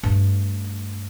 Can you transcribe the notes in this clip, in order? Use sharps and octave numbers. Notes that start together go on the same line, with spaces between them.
G2 A3